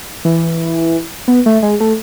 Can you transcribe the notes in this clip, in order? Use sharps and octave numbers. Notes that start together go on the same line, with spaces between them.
E3
B3
A3
G#3
A3